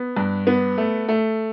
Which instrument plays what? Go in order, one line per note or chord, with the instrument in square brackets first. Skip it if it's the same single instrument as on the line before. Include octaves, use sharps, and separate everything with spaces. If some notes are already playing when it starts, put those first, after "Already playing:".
Already playing: [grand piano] B3
G2
B3
A3
A3